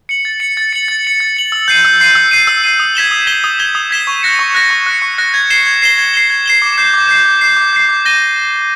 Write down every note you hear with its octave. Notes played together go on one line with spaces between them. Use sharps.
C#7 F#7
A6
C#7 F#7
A6
C#7 F#7
A6
C#7 F#7
A6
C#7 F#7
E6
G6 C7 D#7
E6
G6 C7 D#7
E6
G6 C7 D#7
E6
G6 C7 D#7
D#6
G#6 B6 E7 G7
D#6
G#6 B6 E7 G7
D#6
G#6 B6 E7 G7
D#6
G#6 B6 E7 G7
C#6
F#6 A#6 C#7
C#6
F#6 A#6 C#7
C#6
F#6 A#6 C#7
C#6
F#6 A#6 C#7
G#6
C7 E7 G7
G#6
C7 E7 G7
G#6
C7 E7 G7
G#6
C7 E7 G7
D6
G6 C7
D6
G6 C7
D6
G6 C7
D6
G6 C7
D6
G6 A#6 D#7 G7